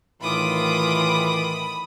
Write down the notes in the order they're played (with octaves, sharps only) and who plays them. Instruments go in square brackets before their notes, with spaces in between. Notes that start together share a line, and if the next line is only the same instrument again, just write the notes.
[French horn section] A2 D#3 [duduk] E3 [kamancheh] F4 D6 [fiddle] B5 D#6